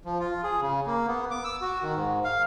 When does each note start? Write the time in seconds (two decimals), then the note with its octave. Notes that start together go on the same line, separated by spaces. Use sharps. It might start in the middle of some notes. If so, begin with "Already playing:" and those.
0.05 F3
0.20 F4
0.44 G#4
0.61 C#3
0.87 A#3
1.07 B3
1.31 D6
1.44 E6
1.61 F#4
1.82 D#3
1.95 G#2
2.24 F5